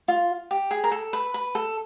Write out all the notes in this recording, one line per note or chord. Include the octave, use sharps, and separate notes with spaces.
F4
G4
G#4
A#4
A4
B4
B4
A4